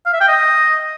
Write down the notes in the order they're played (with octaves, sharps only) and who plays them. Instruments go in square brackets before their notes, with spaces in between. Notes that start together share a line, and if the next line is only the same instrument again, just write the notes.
[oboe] F5
E5
G5
D#5